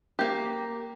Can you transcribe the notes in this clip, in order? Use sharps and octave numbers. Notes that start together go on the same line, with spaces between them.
A#3 G4